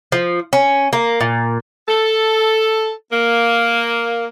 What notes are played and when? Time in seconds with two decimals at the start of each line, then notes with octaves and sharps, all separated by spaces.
0.12 F3
0.53 C#4
0.93 A#3
1.21 A#2
1.88 A4
3.12 A#3